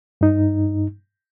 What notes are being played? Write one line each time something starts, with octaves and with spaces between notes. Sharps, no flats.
G2 D#4